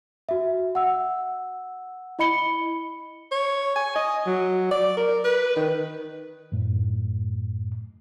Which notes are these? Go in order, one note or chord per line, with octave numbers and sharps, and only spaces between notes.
F#4 E5
F#5 E6
E4 D#5 B5 C#7 G7
C#5
G#5
D#5
F#3
D5
A#4
B4
D#3
F#2 A2